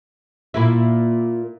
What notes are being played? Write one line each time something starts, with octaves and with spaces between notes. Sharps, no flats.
A#2 A#3 E4